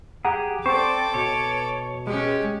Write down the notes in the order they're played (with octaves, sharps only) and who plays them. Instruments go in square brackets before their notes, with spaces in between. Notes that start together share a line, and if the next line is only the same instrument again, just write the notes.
[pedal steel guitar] G4 G#4 [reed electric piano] F#5 A#5
[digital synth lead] C4 [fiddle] A4 D6 [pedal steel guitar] C5 D5 [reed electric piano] C#6
[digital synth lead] B2 [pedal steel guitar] C#5
[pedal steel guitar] G#3 [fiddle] C#4 G4